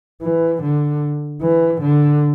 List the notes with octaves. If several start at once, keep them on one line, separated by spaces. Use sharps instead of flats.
E3
D3
E3
D3